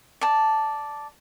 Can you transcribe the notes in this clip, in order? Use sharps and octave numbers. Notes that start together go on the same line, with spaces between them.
D5 A5